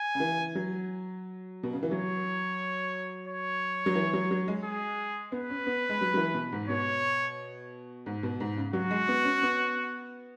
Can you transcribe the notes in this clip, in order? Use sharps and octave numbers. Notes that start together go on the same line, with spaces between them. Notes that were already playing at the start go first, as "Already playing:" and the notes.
Already playing: G#5
C#3
E3
F#3
B2
C#3
E3
F#3 C#5
C#5
F#3
E3
F#3
F#3
G#3
G#4
B3 B4
C#4
B3
G#3
F#3
F#3
E3
B2
G#2
B2 C#5
G#2
B2
G#2
C#3
F#3 F#4
G#3
B3
C#4
B3